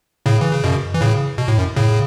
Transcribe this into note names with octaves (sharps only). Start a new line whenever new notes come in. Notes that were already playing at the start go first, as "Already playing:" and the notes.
A2 C#3
E3
C#3
F#2 B2
E3
A2 C#3
B2
A2
F#2
A2 C#3